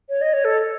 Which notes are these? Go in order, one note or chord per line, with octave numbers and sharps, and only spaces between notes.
C#5
D#5
C#5
A4